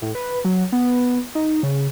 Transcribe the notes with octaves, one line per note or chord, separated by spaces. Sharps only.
A2
B4
F#3
B3
D#4
C#3